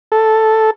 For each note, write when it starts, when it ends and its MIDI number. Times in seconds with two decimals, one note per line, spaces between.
0.12 0.71 69